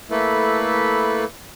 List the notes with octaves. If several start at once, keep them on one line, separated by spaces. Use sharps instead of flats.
A3 A#3 E4 A4 B4